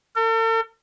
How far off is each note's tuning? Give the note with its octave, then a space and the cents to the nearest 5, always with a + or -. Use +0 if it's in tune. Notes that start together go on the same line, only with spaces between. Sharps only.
A4 +45